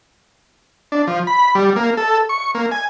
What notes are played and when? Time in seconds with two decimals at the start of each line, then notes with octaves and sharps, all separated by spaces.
0.92 D4
1.07 F3
1.27 B5
1.55 G3
1.76 A#3
1.97 A4
2.29 C#6
2.55 A#3
2.71 G#5